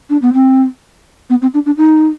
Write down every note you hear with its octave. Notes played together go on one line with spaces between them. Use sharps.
D4
B3
C4
B3
C4
D4
D4
D#4